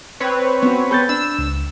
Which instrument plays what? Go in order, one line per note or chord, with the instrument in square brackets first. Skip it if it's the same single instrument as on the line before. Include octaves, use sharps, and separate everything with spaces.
[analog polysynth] C4 B4 C#5
[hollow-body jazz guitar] B3 C#4 F#4
[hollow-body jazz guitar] B3 G#4 A4 [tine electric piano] B5 G6 A6
[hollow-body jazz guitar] D4 [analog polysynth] E6
[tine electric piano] C#2